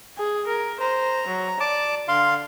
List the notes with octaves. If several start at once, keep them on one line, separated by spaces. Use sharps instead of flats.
G#4
A#4
C5 A#5
F#3
D5 A5 D6
D3 F5 C6